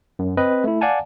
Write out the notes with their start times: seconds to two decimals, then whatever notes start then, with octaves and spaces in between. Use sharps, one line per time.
0.19 F#2
0.37 C4 B4 D#5
0.64 A3 E4
0.81 D5 F5 F#5 G#5 A5